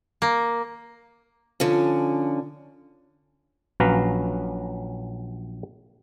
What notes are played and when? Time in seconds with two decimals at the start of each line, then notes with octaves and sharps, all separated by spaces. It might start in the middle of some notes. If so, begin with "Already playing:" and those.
0.22 A#3
1.60 D3 F3 C#4
3.80 A#1 F#3 C#4 B4 F5 A#5